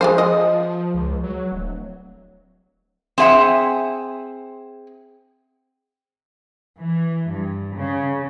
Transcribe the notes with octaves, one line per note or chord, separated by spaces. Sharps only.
F3 G#3 F4 C5
D#5
C#2
F#3
D1
C4 G#4 E5 F#5
E3
G2
C#3